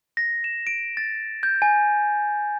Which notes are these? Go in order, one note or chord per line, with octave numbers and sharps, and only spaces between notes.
A#6
E7
D7
A6
G6
G#5